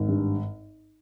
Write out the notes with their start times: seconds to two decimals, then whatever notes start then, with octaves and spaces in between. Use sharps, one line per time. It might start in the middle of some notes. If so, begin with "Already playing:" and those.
Already playing: G#1
0.08 G2